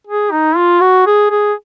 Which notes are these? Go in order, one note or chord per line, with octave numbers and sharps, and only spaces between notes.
G#4
D#4
F4
F#4
G#4
G#4